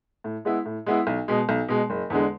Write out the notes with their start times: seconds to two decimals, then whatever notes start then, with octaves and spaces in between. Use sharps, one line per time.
0.24 A2
0.45 G#3 B3 E4
0.65 A2
0.86 G#3 B3 E4
1.07 B1
1.28 B2 G#3
1.49 B1
1.69 B2 G#3
1.90 F#1
2.10 E2 D3 G#3